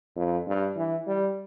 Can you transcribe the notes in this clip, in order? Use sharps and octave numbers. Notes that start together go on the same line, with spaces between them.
F2
G2
E3
G3